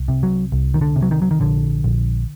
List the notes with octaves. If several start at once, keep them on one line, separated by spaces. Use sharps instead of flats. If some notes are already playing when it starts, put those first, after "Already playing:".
Already playing: C2
C3
F#3
C2
D#3
D3
C3
F#3
D#3
F#3
D#3
A#1 D3
A#1